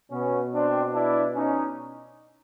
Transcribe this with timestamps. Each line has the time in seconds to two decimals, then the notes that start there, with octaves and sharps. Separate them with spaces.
0.11 B2 B3 C#4
0.53 C4 D4
0.93 D4 E4
1.34 C#4 D#4